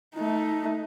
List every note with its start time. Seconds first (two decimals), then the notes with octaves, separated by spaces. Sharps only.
0.15 A3 D#4